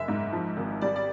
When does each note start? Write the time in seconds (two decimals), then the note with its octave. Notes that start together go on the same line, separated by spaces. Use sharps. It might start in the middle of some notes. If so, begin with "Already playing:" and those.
Already playing: F#1 G#3 E5
0.08 G#2
0.33 F3
0.57 G#1
0.81 G3 D5
0.96 D5